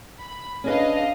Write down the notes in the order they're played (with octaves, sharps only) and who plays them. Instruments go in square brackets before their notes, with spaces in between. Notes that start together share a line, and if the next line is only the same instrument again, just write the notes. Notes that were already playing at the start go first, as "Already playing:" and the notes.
[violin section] B5
[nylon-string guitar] C#4 G#4 B4 [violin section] D4 D#5 F5